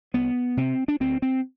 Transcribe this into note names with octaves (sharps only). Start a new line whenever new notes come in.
C2 B3
C3 C4
D4
D2 C4
C4